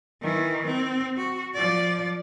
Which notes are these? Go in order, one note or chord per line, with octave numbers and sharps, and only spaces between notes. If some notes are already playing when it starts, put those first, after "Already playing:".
D#3 E3
C4
F#4
F3 D5